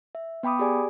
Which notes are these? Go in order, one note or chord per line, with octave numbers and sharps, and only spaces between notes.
E5
B3 G5 B5 D6 D#6
G4 G#4 D5 G#5